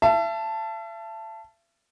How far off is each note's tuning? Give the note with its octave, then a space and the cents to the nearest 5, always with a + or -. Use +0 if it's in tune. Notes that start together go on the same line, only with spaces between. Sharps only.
E5 +40 A5 +0